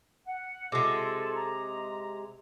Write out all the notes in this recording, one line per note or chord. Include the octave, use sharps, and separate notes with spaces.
F#5
C3 G#3 F4 A4
A#5